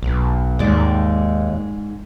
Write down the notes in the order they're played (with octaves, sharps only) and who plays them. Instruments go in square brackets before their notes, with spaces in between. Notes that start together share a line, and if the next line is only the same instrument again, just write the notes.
[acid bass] B1
[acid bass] D#2 [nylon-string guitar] G#2 G#3 D5